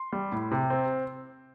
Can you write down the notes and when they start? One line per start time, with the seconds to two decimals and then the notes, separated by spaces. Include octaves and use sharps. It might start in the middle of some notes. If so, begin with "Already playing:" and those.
Already playing: C6
0.13 G3
0.32 A2
0.51 C3
0.70 C4